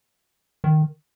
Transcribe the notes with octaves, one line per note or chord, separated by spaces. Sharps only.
D#3